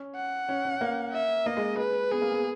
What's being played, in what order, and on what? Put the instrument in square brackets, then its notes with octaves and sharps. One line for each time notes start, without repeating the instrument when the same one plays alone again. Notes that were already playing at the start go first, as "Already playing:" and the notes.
Already playing: [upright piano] C#4
[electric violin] F#5
[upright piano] C#4
C#4
A#3
[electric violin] E5
[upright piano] A#3 [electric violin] D#5
[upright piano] G#3
[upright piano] G#3 [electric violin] B4
[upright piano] B3 [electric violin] G#4
[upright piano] A#3
B3